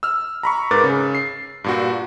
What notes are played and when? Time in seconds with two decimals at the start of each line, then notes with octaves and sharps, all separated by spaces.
0.03 E6 F6
0.43 A#5 B5 C#6
0.71 G#2 A#4 B4 D6 A6
0.84 C#3
1.15 C7
1.64 G2 A#2 F#4